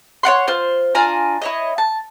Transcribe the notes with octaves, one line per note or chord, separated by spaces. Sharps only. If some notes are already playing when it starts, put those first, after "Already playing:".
C#5 D5 F#5 C6
F4 C5
D4 F4 G#5 A#5
E4 C#5 D#5
A5